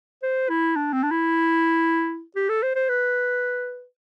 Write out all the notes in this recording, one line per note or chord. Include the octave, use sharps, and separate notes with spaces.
C5
E4
D4
C4
D4
E4
G4
A4
C5
C5
B4